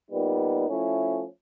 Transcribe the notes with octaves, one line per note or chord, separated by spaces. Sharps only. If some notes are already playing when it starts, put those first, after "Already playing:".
A#2 G3 B3 D#4
F3 A3 C#4 E4